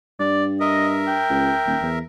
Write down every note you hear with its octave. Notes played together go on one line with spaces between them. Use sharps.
G2 D5
A#4 D#5 E5
G5
C#2
D#1
E2